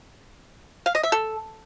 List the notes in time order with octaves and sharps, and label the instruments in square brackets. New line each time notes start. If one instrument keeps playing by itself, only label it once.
[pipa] F5
D#5
E5
A4